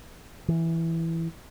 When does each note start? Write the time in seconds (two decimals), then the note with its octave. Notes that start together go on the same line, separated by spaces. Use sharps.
0.48 E3